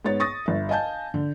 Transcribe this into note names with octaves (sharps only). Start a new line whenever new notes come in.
G#2 B3 C#5 A6
C#6 D#6 A6 A#6
G1 E5
D#5 F5 G#5 A5 G6
D3